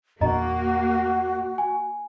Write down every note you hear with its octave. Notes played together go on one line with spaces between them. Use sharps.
E2 A#2 A#3 D4 F#4 D#5 A#5
G#5